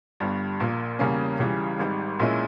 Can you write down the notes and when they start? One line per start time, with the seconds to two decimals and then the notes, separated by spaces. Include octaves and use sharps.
0.20 G1 G2 G3
0.60 A#1 A#2 A#3
0.99 E2 C#3 G3 A#3 C#4
1.39 C#2 C#3 E3 G3
1.79 G#1 G#2 G3
2.20 A#1 A#2 G#3 C#4 E4